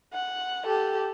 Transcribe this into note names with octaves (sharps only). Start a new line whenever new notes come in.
F#5
G4 A4